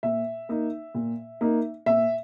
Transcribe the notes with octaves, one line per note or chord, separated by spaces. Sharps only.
A#2 E5
A#3 D#4
A#2
A#3 D#4
A#2 E5